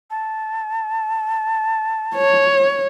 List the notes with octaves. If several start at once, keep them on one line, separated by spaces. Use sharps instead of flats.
A5
C#5